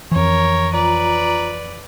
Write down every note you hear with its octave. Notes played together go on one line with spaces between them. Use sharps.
F2 E3 A#4 C#5
F4 B4 D5 A#5